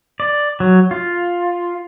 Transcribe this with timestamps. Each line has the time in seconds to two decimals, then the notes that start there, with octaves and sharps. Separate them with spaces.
0.20 D5
0.60 F#3
0.91 F4